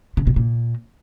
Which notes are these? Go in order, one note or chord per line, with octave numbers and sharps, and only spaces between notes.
C#3
B2
A#2